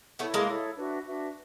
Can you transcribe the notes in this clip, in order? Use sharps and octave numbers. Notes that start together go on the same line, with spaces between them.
A3 B3 E4 A4 C#5 E5
G#3 A#3
E4 A4 C#5 E5
D4 F#4 B4 E5
D4 F#4 B4 E5